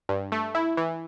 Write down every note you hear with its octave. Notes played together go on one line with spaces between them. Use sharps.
G2
A3
E4
E3